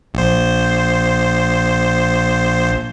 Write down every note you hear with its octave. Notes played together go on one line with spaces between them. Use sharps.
A#1 C5